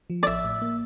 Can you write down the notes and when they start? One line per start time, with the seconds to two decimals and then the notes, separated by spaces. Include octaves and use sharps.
0.10 F3
0.23 D5
0.27 A1 E5
0.44 A2
0.62 A#3